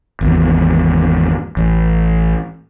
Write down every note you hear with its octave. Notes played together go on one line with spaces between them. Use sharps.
G#1 E2
A1